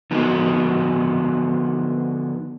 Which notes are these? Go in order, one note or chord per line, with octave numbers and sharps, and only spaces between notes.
D3 F3 B3 D#4 F#4